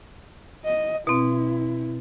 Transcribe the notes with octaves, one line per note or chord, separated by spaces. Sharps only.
D#5
B2 C4 E4